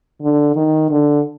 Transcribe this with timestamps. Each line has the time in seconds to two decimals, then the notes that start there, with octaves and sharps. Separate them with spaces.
0.21 D3
0.56 D#3
0.90 D3